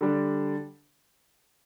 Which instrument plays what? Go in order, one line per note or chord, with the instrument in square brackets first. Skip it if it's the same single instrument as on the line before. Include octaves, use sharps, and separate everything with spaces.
[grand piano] D3 G3 D4